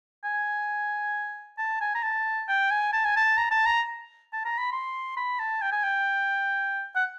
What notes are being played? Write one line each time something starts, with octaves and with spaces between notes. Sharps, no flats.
G#5
A5
G#5
A#5
A5
G5
G#5
A5
G#5
A5
A#5
A5
A#5
A5
A#5
B5
C6
B5
A5
G5
G#5
G5
F#5